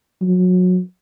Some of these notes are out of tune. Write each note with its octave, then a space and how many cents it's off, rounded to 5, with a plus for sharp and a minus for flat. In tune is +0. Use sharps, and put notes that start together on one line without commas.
F#3 -25